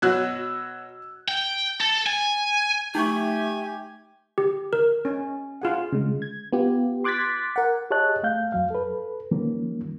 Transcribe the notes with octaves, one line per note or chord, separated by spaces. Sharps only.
B2 F#3 E6 F#6 G#6
G5
A4
G#5
A3 D#4 G4 G#5 C#6
G4
A#4
C#4
F4 G#4 F#5
C#3 G#3
G#6
B3 F4 G4
C6 D6 F#6 G#6 A6 B6
A#4 F#5
G4 G#4 C#5 D#5 A5 F#6
A3 F5 G6
F2 F#3 F5
A4 B4
D#3 F3 G3 A#3 C#4